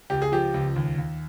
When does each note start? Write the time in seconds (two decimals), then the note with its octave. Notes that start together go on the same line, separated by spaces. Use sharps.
0.10 C#2 G4
0.22 G#4
0.32 F3 G4
0.54 C#2
0.76 D#2
0.98 D#2